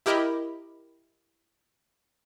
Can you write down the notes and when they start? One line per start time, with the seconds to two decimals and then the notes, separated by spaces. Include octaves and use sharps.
0.06 E4 G4 A#4 D#5 B5